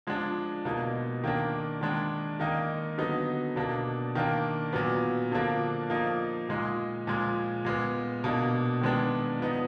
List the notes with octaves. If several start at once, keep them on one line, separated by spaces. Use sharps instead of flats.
F3 G#3 D4
B2 A#3 D#4
D#3 A#3 D4
D#3 G#3 D4
D#3 A#3 D#4
D3 F#3 B3 D#4
B2 A#3 D4
D#3 A#3 D4
A#2 F#3 B3
D3 F3 A#3 D4
F3 A#3 D#4
A#2 G#3 D#4
A#2 F3 G#3
A#2 G#3 B3
B2 A#3 D4
D#3 G#3 B3 D4
F3 B3 D#4